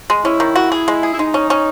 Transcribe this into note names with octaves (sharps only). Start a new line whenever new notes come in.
G#3
C#4 E4
D#3
F#4
G#4
G#3
G#4
E4
G#3 D#4
C#4
C#4